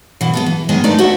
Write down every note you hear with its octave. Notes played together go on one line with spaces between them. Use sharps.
B2 E3
G#3 B3 A4
E3
A2 D#3 G#3 B3 G#5
G#3 A3 D#4 A4 B4 D5
F#4 C5 E5 F#5